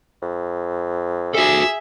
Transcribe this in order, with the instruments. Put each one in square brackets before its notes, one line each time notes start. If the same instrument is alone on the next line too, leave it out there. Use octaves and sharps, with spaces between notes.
[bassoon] F2
[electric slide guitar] F#4 A4 [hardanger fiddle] G#4 E5